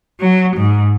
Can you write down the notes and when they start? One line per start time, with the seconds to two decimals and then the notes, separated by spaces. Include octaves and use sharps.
0.20 F#3
0.56 G#2